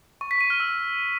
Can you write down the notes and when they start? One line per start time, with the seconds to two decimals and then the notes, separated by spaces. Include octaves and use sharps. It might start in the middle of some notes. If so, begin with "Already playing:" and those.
0.21 C#6
0.31 B6
0.41 D#7
0.50 F6
0.60 E6